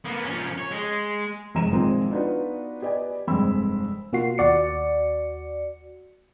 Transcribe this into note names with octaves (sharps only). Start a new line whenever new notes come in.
A#3 B3
F3 C#4
C#5
G#3
F1 F#2 G#3 A#5 D#7 E7
A#2 D#3 F3 G#3 C4
B3 D4 D#4 F4 F#4 B4
G4 B4 D5 D#5 G#5
F1 G2 G#3 C4 B5 E6
B2 A#3 F4 F#4 C7
D#2 F#4 D5 C#7